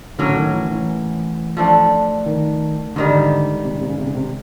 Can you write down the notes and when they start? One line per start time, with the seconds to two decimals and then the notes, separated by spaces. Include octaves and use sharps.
0.19 A2 D3 F#3 A#3 C#4
0.36 D#3
0.54 E3
0.71 E3
1.57 F3 A3 D4
2.26 D#3
2.96 G#2 D3 D#3 G3
3.65 C3
3.73 C#3
3.81 C3
3.90 C#3
3.98 C3
4.07 C#3
4.15 C3